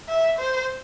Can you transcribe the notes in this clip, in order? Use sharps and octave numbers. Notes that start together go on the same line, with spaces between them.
E5
C5